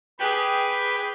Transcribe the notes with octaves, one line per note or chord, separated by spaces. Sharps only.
G4 G#4 B4 G5 B5